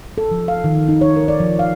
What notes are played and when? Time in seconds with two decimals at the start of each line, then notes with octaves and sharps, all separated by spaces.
0.18 A4
0.31 F3
0.48 F5
0.64 D#3
0.88 D#4
1.01 C#5
1.16 A#4
1.28 D5
1.40 F3
1.59 F5